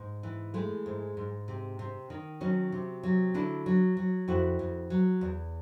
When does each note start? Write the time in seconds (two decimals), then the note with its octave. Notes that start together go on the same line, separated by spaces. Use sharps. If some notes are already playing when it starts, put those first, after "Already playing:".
Already playing: G#2
0.23 E3
0.54 G#3 A3
0.86 G#2
1.17 G#2
1.48 C3
1.79 C3
2.10 D#3
2.41 F#3 C#4 D#4
2.72 C3
3.03 F#3
3.34 D3 D4 E4
3.66 F#3
3.97 F#3
4.28 F2 E4 F#4
4.59 F2
4.90 F#3
5.21 E2